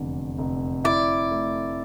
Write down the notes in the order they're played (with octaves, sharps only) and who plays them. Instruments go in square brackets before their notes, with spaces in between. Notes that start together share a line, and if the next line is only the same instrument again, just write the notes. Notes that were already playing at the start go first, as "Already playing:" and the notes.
Already playing: [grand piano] F1 E2 D3
F1
[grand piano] E4 [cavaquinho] D5
[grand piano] A3